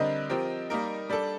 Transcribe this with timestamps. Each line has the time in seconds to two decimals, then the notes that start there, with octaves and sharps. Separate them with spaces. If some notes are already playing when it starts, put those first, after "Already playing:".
Already playing: D3 G3 C4 G4 A#4 D#5
0.29 F3 C4 G4 A#4
0.70 G3 A#3 D#4 A#4
1.10 G3 D4 A4